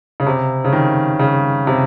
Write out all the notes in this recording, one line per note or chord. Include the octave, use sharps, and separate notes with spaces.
C#3
C3
C#3
D#3
C#3
C3